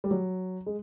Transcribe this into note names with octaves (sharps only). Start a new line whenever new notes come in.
G3
F#3
G#3